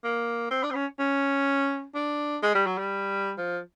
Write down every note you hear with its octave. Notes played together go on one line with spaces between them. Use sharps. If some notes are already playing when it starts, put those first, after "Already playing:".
A#3
C4
D4
C4
C#4
C#4
D4
G#3
G3
F#3
G3
F3